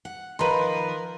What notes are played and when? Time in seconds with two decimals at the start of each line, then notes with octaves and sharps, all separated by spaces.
0.05 F#5
0.39 D#3 F3 A#4 B4 A#5 C6